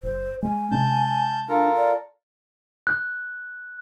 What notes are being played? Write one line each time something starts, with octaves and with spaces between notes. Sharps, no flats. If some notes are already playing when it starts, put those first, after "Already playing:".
F#1 C5
G#3 G#5
C3 G#3 C#4 A5 G6
D4 F4 A4 A#4
D5
F#6